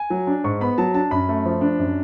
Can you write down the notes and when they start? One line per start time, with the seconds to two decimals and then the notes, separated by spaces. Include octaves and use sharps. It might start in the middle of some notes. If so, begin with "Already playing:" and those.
Already playing: G#5
0.10 F#3
0.27 D4
0.44 G#2 C#6
0.61 B3 B5
0.78 F#3 A5
0.94 D4 A5
1.11 F#2 B5
1.29 A3
1.45 F3
1.61 D4
1.79 F#2